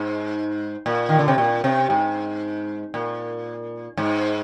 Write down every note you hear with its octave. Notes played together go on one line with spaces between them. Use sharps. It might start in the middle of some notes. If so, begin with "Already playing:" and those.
Already playing: G#2
A#2
D#3
D3
C3
A#2
C3
G#2
A#2
G#2